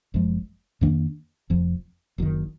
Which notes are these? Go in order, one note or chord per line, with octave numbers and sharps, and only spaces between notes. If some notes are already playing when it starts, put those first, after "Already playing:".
F#1 F#2 F3 G#3
F2 D#3 A#3 D4
F1 F2 F3
F#1 F#2 D#3